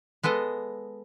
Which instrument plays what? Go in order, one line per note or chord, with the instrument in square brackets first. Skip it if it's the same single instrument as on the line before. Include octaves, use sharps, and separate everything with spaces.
[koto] G#3 B3 A4 D#5